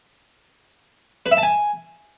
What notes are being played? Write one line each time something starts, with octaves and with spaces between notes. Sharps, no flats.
B4
E5
A5
G#5